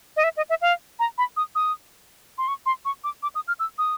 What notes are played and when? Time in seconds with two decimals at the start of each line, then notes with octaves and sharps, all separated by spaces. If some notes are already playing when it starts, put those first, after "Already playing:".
0.16 D#5
0.24 E5
0.37 D#5
0.49 E5
0.61 F5
0.99 A#5
1.18 B5
1.37 D#6
1.55 D#6
2.38 C6
2.48 C#6
2.66 C6
2.85 C#6
3.04 D6
3.23 D6
3.35 D#6
3.48 F6
3.60 E6
3.78 D#6